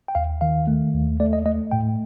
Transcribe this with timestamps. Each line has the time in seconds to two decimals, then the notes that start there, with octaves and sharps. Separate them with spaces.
0.08 G5
0.15 D#2 F5
0.41 D#3 F5
0.67 A3
0.93 D#2
1.20 A3 D5
1.33 D#5
1.45 A3 D#5
1.71 A2 G5